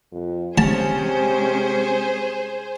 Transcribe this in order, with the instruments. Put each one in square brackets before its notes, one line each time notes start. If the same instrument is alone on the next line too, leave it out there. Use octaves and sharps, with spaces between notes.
[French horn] F2
[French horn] C3 [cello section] G#3 C#4 [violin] G#4 C5 [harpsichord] A5